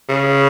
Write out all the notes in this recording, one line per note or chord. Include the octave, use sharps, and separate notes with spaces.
C#3